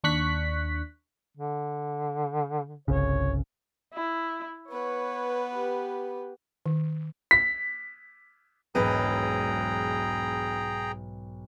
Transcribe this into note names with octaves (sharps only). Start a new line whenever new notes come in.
D#2 D4 C#6 F#6 B6
D3
G1 C2 C#3 C#5
E4
B3 B4 C#5
G4
D#3
B6
E1 B1 G#2 G#4 B4 G5 A#5